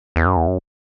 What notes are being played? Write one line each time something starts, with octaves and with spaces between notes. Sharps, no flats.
E2
F#2
E2
F#2